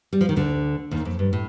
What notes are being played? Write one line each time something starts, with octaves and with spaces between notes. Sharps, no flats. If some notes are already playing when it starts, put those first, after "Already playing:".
G3
F3
D#3
D2 D3
D#2 D#3
F2
G2
A2